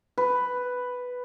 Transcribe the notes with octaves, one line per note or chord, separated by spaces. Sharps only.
B4